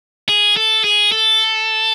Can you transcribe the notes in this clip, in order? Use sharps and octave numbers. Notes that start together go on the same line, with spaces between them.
G#4
A4
G#4
A4